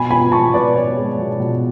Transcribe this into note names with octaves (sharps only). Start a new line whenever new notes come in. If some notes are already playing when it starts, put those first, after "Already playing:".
Already playing: B2 G#5 B5
B3 G#5 B5
B2 A5 C#6
B2 B4 D5
B3 C#5
G#3
B2
B2